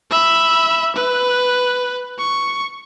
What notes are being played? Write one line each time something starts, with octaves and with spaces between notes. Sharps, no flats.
E5 B5
B4
C#6